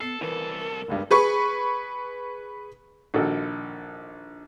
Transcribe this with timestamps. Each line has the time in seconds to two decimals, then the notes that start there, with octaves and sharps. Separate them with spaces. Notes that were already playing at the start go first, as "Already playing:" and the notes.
0.01 B3 A4 C7
0.21 C2 E3 A4 A#4
0.59 A#4
0.88 G1 C#2 G2
1.11 G#4 B4 C#6
3.14 A#1 D#3 F#4 A4 A#4 D#5